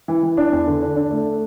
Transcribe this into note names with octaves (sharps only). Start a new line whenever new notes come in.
E3
E3
D4
E2
D3
D4
D4
A3